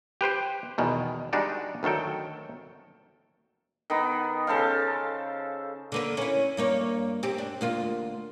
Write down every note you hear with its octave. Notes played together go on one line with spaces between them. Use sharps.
G4 B4 C5 G5
E2 B2 D#3
G3 G#3 D4 D#4 F#4 D5
D2 D#3 F#3 A4 G5
D#3 B3
C#3 A4 C5 F5
D3 A#3 B4
C#4 E4
G2 A#3 C#5
C4 G4
D4
D2 A#3 F4